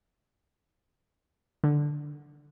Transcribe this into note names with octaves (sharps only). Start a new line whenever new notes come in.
D3